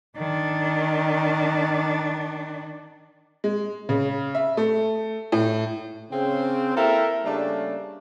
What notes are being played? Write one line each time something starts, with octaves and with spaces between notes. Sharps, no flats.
D#3 D4
G#3
C#3
E5
A3
A2
C#3 C4
A#3 E4 G4 A4 A#4 E5
C#3 G3 A3 A#3 D4